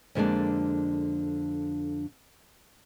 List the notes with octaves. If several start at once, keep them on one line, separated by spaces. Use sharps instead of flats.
F2 D3 G#3 A#3 D4 A5